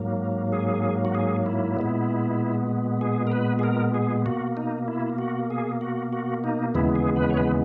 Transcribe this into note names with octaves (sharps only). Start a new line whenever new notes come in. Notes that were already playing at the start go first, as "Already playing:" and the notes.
Already playing: G#2 F#3 A#3
G#4
F#4
G#4
E4
A#2 G#3 B3
G#4
A#4
B4
G#4
A#4
G#4
B2 A#3 F#4
D#4
E4
F#4
G#4
F#4
F#4
D#4
D#2 C#3 E3 G#3 B3 E4
G#4
B4
C#5
B4